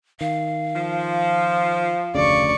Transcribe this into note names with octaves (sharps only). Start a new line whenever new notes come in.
D#3 F5
F3
F1 D2 C#3 D5 C#6